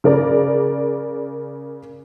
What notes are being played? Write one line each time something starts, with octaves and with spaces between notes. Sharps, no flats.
C#3 A#4 D5